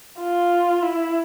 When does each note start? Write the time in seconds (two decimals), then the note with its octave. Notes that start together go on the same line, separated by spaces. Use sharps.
0.19 F4
0.82 E4